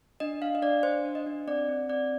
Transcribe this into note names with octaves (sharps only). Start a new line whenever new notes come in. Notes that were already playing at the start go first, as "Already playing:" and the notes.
D4 D#5
D4 F5
D#5
D4 D5
D4 C5
D4
D#5
D4
C4 D5
C4
C4 D5